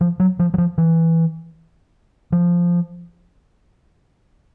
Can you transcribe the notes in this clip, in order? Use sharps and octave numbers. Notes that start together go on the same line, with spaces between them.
F3
F#3
F3
F#3
F3
E3
F3